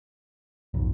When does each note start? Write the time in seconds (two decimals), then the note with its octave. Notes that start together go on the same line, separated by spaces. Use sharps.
0.74 B1 F2 G#2